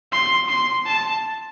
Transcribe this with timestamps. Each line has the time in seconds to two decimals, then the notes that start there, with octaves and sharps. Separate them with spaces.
0.12 C6
0.49 C6
0.86 A5